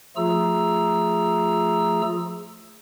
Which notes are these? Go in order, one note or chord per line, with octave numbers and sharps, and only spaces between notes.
F3 A3 F4 G#4 A#5 E6